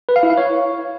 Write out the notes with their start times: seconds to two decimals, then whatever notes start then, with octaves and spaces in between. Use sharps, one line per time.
0.09 B4
0.16 F5
0.23 E4
0.30 F5
0.37 C#5